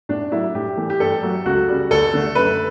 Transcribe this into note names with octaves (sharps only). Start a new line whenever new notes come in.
A2 D4
F#3 A3 E4
A2 G4
E3 A3
G4
G2 A4
F#3 A3
C#2 F#4
C#3 G3
D2 A4
D3 A3
F#2 B4